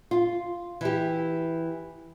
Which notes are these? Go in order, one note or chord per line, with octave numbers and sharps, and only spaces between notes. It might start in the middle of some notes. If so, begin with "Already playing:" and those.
F4
E3 G4